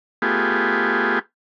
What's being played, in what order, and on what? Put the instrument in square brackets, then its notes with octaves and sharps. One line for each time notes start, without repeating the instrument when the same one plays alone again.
[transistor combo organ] A3 B3 F4 G4 G#4